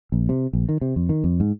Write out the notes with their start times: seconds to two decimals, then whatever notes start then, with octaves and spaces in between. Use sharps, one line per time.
0.12 A#1
0.29 C3
0.53 A#1
0.69 D#3
0.81 C3
0.96 F2
1.09 D#3
1.24 F2
1.40 G#2